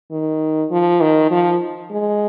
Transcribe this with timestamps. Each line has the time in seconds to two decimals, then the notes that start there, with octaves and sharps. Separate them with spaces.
0.11 D#3
0.71 F3
1.01 D#3
1.31 F3
1.91 G#3